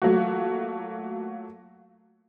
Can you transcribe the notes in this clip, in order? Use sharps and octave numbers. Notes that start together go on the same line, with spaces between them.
F#3 A3 A#3 F4 F#4